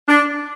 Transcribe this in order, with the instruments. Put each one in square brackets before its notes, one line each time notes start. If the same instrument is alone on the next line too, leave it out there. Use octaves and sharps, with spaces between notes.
[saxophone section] D4